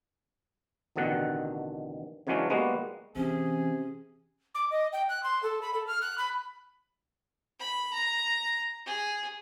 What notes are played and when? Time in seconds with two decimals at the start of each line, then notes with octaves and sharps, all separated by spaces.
0.96 A1 B2 D3 D#3 F#5
2.27 C#3 E3 F#3 G#3 C#4 D4
2.50 G3 G#3 A#3 B3 F#4
3.16 C3 E3 C#4 G#4
4.55 D6
4.71 D#5
4.93 G5
5.09 F#6
5.23 C6
5.43 A4
5.62 B5
5.74 A4
5.87 F6
6.02 F#6
6.18 B5
7.59 B5
7.94 A#5
8.86 G#4